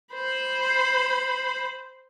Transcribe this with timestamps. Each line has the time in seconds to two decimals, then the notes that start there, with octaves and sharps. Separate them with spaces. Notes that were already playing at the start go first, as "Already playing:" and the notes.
0.14 C5 B5